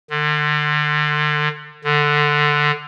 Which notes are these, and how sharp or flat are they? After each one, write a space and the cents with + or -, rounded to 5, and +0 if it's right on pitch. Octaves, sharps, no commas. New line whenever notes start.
D3 +35
D3 +10